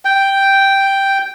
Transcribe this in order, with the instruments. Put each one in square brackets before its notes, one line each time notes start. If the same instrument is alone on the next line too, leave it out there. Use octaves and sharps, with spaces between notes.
[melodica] G5